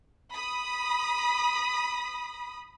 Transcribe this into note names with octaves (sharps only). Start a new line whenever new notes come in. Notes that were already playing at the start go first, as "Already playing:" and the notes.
B5 D#6